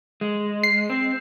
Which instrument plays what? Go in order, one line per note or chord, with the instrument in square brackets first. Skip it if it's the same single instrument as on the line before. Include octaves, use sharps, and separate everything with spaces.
[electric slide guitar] G#3
[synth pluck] C7
[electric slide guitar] C4